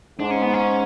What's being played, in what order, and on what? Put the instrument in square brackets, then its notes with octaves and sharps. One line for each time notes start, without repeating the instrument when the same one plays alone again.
[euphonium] G#2 [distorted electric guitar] D4
[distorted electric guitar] C#4
B3
C#4